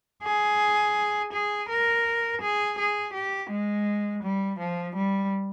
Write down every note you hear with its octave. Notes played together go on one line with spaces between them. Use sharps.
G#4
G#4
A#4
G#4
G#4
G4
G#3
G3
F3
G3